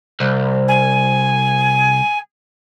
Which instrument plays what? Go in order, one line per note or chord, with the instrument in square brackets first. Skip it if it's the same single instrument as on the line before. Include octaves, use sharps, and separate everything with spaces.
[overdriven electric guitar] C2
[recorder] G#5